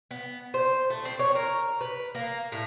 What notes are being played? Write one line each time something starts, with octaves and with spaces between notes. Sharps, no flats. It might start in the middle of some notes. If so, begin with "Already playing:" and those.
B3
C5
A3
C4
C#5
A#4
B4
A#3
A2